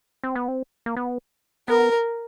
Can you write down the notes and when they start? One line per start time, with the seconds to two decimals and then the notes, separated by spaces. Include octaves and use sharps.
0.24 C4
0.35 B3
0.48 C4
0.86 A#3
0.97 B3
1.68 B3 A#4